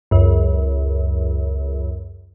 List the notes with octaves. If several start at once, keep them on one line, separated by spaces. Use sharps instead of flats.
C#2 F#2